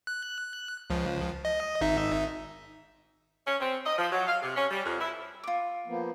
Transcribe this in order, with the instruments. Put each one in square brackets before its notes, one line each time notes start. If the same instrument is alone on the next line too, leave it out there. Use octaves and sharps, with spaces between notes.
[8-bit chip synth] F#6
C#2 F3
D#5
G#1 D#4 E5
[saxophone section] C#4
C4
D#5
F3
F#3
F5
C3
C#4
G3
F2
E4
[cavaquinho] F4 D6
[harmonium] F3 A#3 B3